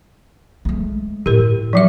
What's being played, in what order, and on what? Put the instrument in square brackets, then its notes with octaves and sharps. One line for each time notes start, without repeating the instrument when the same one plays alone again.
[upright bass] G#3 A3
[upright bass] A2 [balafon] G4 A#4
[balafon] F3 F#3 E5